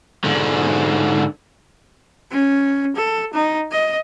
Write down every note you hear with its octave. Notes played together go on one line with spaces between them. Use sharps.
G#2 D3
C#4
A4
D#4
D#5